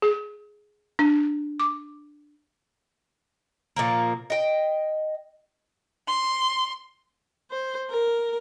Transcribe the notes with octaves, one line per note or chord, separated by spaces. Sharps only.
G#4
D4
D6
A#2 F3 A#3
D#5 G5
C6
C5
A#4